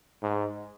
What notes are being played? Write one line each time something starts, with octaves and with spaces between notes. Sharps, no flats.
G#2